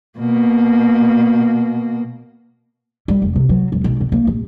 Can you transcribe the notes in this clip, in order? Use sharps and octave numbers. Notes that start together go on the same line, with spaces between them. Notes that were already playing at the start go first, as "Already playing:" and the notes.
B2 A#3
G3
F1
C3
F#3
E1
B1
B2
A#3
D1